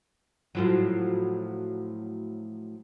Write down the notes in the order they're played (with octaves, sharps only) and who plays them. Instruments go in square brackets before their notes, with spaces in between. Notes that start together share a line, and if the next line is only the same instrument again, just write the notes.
[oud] A2 F3 F#3